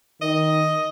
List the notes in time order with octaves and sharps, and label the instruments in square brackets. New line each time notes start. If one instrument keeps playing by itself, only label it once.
[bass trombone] D#3 [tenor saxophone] D#5